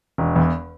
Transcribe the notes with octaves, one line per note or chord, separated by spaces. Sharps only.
E1
E2